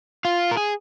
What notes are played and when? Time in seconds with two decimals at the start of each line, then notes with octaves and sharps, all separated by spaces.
0.25 F4
0.51 A#4
0.57 G#4